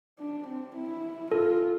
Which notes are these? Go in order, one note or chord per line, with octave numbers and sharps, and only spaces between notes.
D4
C4
E4
F4 A4